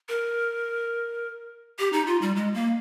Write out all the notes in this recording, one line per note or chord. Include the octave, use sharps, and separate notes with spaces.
A#4
G4
D#4
F4
G3
G#3
A#3